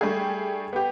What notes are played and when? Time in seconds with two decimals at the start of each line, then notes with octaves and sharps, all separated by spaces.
0.01 G3 A3 D4 G#4
0.73 B3 G4